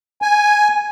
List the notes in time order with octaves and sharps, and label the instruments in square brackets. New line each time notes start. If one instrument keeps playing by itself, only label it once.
[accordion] G#5